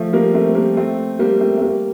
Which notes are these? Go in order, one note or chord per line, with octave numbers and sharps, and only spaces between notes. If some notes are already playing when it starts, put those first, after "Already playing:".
Already playing: F3 A3
G3 A#3
A3 C4
G3 A#3
A3 C4
G3 A#3
A3 C4
A3
G3 A#3